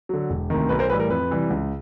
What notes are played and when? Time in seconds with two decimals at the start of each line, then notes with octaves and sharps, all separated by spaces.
0.09 D3 F#3
0.30 E1
0.50 D2 C3 D#3
0.69 B1 B4
0.79 A#4 C5
0.90 A2 E3 G3 B4
1.00 A#4
1.09 F2 B4
1.30 C3 E3 G3
1.50 C#2